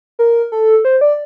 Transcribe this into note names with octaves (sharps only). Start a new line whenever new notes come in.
A#4
A4
C5
D5